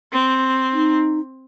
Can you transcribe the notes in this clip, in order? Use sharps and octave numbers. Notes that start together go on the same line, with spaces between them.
C4
D#4